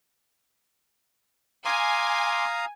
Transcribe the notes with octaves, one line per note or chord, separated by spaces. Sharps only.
F5 G#5 A#5 C6 D6 D#6